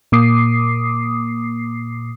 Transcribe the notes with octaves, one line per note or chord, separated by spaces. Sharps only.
A#2 A#3 D6 D#6 C7